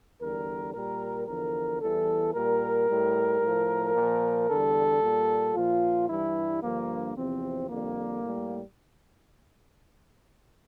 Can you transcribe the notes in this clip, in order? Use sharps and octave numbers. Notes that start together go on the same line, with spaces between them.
E2 D3 G3 A#4
A#2 G3 A#4
E2 D3 F3 A#4
E2 E3 G3 A4
A#2 G3 A#4
A2 G3
A2 F3
A#2 F3
E2 D3 G3 A4
A#2 G3
A#2 F3 F4
G2 E3 G3 E4
G2 D3 F3 A#3
E2 C3 F3 C4
F2 D3 G3 A#3
A2 G3